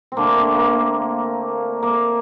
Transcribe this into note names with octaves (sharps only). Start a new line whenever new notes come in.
C4
D3 A3 A#3
A#3
A#3
A#3